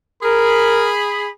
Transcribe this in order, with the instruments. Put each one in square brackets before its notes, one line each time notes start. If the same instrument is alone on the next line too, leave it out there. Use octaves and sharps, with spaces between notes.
[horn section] G#4 B5 [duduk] A#4